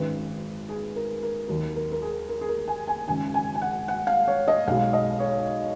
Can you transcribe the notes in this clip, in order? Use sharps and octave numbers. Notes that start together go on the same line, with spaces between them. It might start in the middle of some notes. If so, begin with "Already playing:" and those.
Already playing: G#1 F#2 D#3 B4
G#4
A#4
A#4
D#2 D#3 F#3 A#4
A#4
A#4
G#4
A#4
G#4
A#4
G#5
G#5
G#1 F#2 C#3 G#5
G#5
G#5
F#5
F#5
F5
C#5
D#5
B1 B2 G#3 F5
D#5
C#5